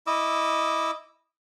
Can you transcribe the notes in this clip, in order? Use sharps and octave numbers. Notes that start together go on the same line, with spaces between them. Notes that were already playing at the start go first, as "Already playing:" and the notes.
E4 D#5 D6 E6